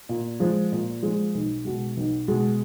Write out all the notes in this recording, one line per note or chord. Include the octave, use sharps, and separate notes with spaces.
A#2
F3 G#3
A#2
F3 G#3
B1
B2 G#3
B1
B2 G#3